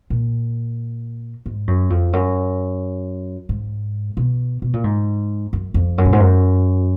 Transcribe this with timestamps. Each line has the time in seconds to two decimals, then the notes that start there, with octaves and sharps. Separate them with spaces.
0.10 A#2
1.46 G#2
1.67 F#2
1.90 F2
2.13 F#2
3.49 G#2
4.17 B2
4.62 B2
4.73 A#2
4.84 G#2
5.53 F#2
5.74 F2
5.98 F#2
6.05 A#2
6.13 G#2
6.20 F#2